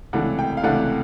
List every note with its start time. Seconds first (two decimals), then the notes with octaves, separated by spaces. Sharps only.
0.13 C#2 C3 E3 A3 D4 F#5
0.39 G5
0.57 F5
0.63 C#2 C3 E3 A3 D4 F#5